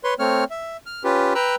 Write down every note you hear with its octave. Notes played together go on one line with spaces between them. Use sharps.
B4 C#5 C6
A3 C4 C#5 F6
E5
F6
C#4 F4 G4 B4
B4 G5 A#5 E6 F#6